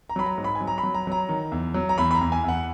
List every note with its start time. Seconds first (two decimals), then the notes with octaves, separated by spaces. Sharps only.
0.10 A#5
0.16 F#3 B5
0.26 A#5
0.38 G#2
0.44 B5
0.55 G#5
0.61 F#3
0.67 A#5
0.78 B5
0.83 F#3
0.95 A#5
1.07 F#3 A#5
1.29 D#3
1.52 E2
1.74 F#3
1.89 A#5
1.98 E2 B5
2.11 B5
2.15 A#5
2.21 E2
2.32 G#5
2.44 E2 F#5